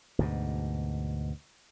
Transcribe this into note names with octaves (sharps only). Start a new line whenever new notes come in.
D2 G#2 B2